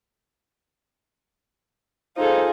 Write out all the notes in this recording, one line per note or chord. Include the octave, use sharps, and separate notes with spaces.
D#4 F4 G#4 A4 C5